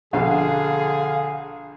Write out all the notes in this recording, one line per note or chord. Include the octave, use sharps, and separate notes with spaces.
A#1 B2 D3 G#4 F5